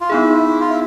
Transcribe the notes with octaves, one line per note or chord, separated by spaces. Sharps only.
F4
B3 D#4 E4 G#4
F4
E4